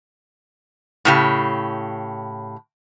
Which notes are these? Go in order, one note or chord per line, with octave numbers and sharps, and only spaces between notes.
A2 C#3 G4